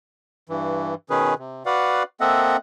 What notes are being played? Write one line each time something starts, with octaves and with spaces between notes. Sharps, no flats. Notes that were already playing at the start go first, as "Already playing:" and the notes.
G2 E3
B2 D#3 C#4 G#4 B4
C3
F#4 B4 D5 F5 F#5
A#3 C4 A4 D#5 E5 F#5